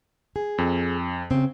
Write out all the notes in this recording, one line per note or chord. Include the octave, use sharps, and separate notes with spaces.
G#4
F2
C#3 C4